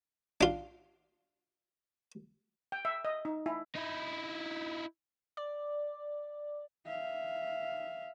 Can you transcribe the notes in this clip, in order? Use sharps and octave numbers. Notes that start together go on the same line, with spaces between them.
D4 F4
G5
E5
D#5
D#4
E4
D#4 E4
D5
E5 F5